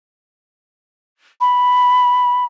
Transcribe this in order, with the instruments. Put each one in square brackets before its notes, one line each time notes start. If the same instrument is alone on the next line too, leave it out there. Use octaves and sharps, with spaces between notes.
[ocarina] B5